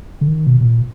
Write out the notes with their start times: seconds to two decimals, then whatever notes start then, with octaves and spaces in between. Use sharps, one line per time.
0.21 D3
0.28 D#3
0.47 B2
0.61 B2
0.65 A#2